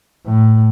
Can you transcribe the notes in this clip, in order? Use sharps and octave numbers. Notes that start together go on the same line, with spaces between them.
A2